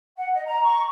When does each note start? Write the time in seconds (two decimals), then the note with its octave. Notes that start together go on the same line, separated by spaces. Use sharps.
0.17 F#5
0.33 D#5
0.46 A#5
0.63 C#6